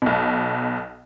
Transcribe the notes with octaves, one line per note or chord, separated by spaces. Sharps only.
B1 B2